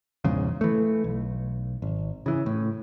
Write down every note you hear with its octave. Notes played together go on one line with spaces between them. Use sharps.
A#1 E2 G#2 C#3
E3 A3
B1
G#1
C#3 E3
A2